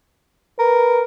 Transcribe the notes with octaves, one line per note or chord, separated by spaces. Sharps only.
A#4 B4